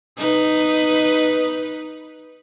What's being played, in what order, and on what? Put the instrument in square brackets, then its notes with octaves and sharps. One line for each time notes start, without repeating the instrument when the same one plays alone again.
[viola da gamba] D#4 B4